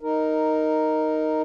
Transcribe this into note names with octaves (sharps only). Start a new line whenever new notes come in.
D#4 A#4